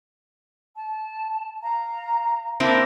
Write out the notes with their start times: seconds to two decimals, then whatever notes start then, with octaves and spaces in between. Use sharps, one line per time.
0.75 A5
1.62 F5 A#5
2.60 A#3 C4 D4 E4 A5 E6